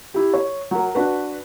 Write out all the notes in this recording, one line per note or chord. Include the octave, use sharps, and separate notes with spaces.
E4 G4
C#5
F#3 A#4
D4 F#4 B4